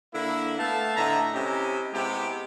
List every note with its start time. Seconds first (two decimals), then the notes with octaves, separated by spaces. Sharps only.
0.14 D3 A#3 E4
0.58 A3 B3 E5 F5 A5
0.96 A2 D3 D#5 E5 A#5
1.34 C3 C#4 E4 G4 D#5
1.93 C3 G#3 B3 E4 G4